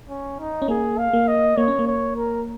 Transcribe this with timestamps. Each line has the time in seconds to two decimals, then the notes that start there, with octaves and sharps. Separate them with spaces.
0.09 C#4
0.40 D#4
0.62 C#4
0.68 A#3 G#4
0.98 F5
1.13 A#3
1.28 D#5
1.57 A#3 C#5
1.68 C#4
1.79 A#3
1.87 C#5
2.17 A#4